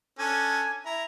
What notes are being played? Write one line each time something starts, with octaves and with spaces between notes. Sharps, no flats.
C#4 D4 A4 G#5
E4 A#5